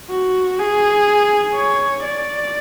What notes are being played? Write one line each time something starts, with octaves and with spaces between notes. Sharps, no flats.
F#4
G#4
C#5
D5